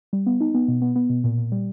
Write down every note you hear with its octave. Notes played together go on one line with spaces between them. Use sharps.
G3
B3
D#4
B3
B2
B3
B3
B2
A#2
A#2
G3